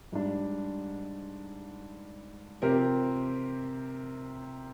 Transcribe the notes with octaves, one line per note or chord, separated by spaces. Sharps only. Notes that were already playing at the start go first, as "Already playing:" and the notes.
G#2 G3 D4
C3 F3 C4 G4 A#4